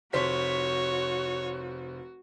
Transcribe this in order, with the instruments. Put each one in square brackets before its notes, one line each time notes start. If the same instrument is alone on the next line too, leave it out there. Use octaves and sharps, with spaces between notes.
[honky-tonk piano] F1 C5 B6 [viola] F#4 [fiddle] C#5